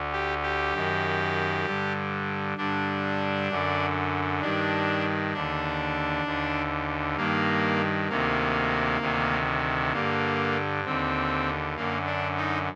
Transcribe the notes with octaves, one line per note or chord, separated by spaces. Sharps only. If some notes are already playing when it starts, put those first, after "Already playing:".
Already playing: D2 D3
G4
G4
F#2 D#3
G2 D3
G2 D3 D4
F#2 D3
G2 D#3 D4
D#2 D3 D4
D#2 D3
G2 D#3 A#3
D2 C3 D#3 A#3
D2 C3 D#3
G2 D3 A#3
D#2 D3 C4
F#2 D3 A#3
D4
D#4